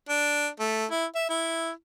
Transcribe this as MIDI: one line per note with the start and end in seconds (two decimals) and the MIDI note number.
0.09 0.48 62
0.60 0.85 57
0.91 1.05 64
1.15 1.29 76
1.30 1.71 64